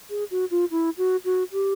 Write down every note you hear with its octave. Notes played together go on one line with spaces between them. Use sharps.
G#4
F#4
F4
E4
F#4
F#4
G4